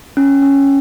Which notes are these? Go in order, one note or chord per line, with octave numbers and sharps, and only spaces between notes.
C#4
C#4